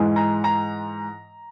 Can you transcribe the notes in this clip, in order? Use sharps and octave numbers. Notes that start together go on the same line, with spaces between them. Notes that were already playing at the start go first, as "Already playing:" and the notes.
Already playing: G#2 E3 G#3
A#5
A#5